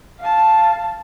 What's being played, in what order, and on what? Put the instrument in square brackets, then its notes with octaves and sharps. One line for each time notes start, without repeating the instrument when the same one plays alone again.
[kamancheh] F5 A5